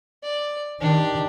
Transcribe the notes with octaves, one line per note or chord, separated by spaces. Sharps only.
D5
D#3 D4 G4